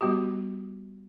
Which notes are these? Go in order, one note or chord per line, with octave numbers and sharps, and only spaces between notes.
G3 B3 F#4 G4